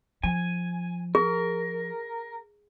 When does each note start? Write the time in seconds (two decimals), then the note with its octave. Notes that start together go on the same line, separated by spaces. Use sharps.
0.23 F3 G#5
1.15 G#4 A#4